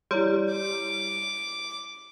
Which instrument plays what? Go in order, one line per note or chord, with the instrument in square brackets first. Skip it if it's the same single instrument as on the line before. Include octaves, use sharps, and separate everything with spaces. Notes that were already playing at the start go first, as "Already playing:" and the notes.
[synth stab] G3 [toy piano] E4 C#5 C6
[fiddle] D6